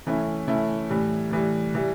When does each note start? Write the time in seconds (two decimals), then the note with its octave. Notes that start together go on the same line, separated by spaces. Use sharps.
0.07 E3 A3 C#4 E4
0.48 E3 A3 C#4 E4
0.89 A2 E3 G3
1.31 A2 E3 G3
1.75 E3 G3